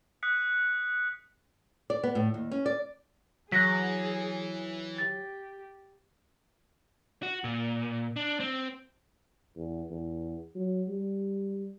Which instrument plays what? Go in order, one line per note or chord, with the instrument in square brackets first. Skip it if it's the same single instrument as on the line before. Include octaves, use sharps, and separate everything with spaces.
[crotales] D#6 F#6 B6 C#7
[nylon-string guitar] D5
B3
A2
D#2
C#4
D5
[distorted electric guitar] E3 [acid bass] F#3 [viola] G#4 [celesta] F#6 A#6 B6
[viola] G4 [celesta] A6
[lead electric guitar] F#4
A#2
D4
C4
[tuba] E2
E2
F#3
G3